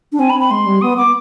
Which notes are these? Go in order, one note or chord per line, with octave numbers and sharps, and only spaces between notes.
D4
C4 G#5
B5
C4
B5
G#3 C6
G3
B3 D#6
B3 D6